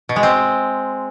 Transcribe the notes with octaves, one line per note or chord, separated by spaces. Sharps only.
B2
G#3
C4